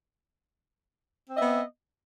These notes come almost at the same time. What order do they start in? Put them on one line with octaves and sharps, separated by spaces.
C4 D#5 E5 B3